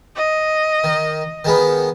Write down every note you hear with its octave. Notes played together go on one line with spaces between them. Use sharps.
D#5
D#3
D#3 G#3 B3